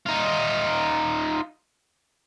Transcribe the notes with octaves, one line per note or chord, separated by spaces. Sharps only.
D#4 F4